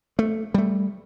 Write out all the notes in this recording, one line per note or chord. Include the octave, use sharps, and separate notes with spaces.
A3
G3 A3